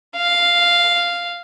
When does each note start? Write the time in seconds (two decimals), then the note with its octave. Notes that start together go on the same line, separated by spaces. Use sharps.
0.17 F5